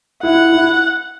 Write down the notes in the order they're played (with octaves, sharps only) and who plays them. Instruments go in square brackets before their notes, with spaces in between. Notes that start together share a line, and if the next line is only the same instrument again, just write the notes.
[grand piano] E4 [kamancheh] F#5
[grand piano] E4